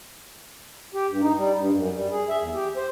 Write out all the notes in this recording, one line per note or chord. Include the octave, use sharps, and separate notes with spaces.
G4
G2
D#4
G3
G2
F#2
G3
G#4
E5
E2
G4
C5